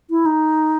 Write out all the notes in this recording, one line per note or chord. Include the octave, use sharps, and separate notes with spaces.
E4
D#4